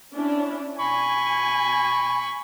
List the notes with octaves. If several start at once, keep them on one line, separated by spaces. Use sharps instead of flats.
C#4 D4 E4
G#5 B5 C#6